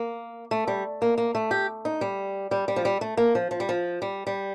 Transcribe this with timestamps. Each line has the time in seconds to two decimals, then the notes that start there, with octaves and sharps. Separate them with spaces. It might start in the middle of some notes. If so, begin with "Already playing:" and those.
Already playing: A#3
0.51 A3
0.68 G3
1.02 A#3
1.18 A#3
1.35 A3
1.51 G4
1.85 D#4
2.01 G3
2.51 G3
2.68 G3
2.76 F3
2.85 G3
3.01 A3
3.17 A#3
3.35 F3
3.51 F3
3.60 G3
3.69 F3
4.02 G3
4.27 G3